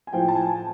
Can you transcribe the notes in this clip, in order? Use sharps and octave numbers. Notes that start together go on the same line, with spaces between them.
G#5
A2 F3 G5
A5
G#5